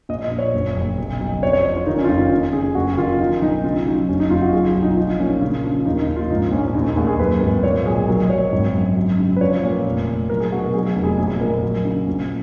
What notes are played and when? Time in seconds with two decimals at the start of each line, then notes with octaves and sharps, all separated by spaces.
0.09 A#1 D#5
0.24 D#5
0.31 A#1
0.39 C#5
0.54 F#1
0.76 F#1
0.98 B1
1.20 B1
1.43 F2 C#5
1.53 C#5
1.65 F2 C#5
1.76 F4
1.86 D#3 D#4
1.98 C#4
2.04 F4
2.09 F#1 D#4
2.31 F2
2.53 C#3 G#4
2.75 F#1 F#4
2.98 D#3 F4
3.20 F3 D#4
3.42 B1 D#4
3.64 C#3 F4
3.86 F#3 D#4
4.08 F#1 C#4
4.20 D#4
4.30 F#1 F4
4.42 F#4
4.53 F#3 G#4
4.68 F4
4.75 B1
4.83 D#4
4.97 F3 D#4
5.19 A#2 C#4
5.41 C#3
5.64 F3
5.86 D#2 D#4
6.00 D#4
6.08 C#3
6.16 F4
6.30 G#2 D#4
6.52 A#1 C#4
6.68 C#4
6.74 D#2 D#4
6.86 D#4
6.97 D#2 G#4
7.08 G#4
7.19 F#2 B4
7.41 G#1 B4
7.63 A#2 C#5
7.86 B1 G#4
8.08 F#3 A#4
8.23 D#5
8.29 F#3 C#5
8.53 G#1
8.74 F#2
8.96 F#3
9.18 C#3
9.36 B4
9.41 F3 C#5
9.56 C#5
9.63 A#2
9.86 F1
10.08 F1
10.29 F#3 A#4
10.40 G#4
10.52 B2 F#4
10.63 A#4
10.74 F#3 G#4
10.96 F1
11.04 G#4
11.18 A#1 G#4
11.41 A#1 A#4
11.63 F#3
11.85 C#3
12.07 A#1